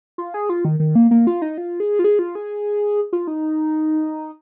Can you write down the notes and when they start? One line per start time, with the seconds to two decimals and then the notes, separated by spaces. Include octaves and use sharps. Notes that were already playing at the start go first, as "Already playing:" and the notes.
0.18 F4
0.34 G#4
0.49 F4
0.65 D#3
0.80 D#3
0.95 A#3
1.11 A#3
1.27 F4
1.42 D#4
1.58 F4
1.80 G#4
1.99 F4
2.04 G#4
2.19 F4
2.35 G#4
3.13 F4
3.27 D#4